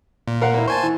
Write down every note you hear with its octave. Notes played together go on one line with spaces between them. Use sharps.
A#2
A#4 F5 F#5
A#3 E4
C5 G#5 A5 C#6
E3